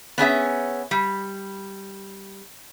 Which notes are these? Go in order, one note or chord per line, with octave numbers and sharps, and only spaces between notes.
B3 C#4 G#4 E5
G3